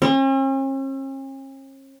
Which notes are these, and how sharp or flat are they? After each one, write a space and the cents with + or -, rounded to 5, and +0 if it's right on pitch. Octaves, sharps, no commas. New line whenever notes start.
C#4 -45